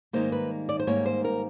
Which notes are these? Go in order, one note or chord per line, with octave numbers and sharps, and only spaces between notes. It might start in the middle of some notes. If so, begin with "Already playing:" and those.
G#2 D#3 G3 A#3 C5
B4
D5
C5
G#2 D#3 G3 A#3 C#5
C5
A#4